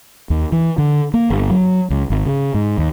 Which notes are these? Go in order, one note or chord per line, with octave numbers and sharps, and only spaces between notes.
D#2
E3
D3
A#3
G1
F#3
C#2
G#1
C#3
G#2
D#2